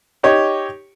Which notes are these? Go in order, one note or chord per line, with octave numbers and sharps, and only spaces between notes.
D#4 G4 C#5